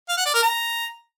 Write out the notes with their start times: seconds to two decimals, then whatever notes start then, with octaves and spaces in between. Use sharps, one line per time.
0.09 F5
0.17 F#5
0.26 D5
0.34 A#4
0.43 A#5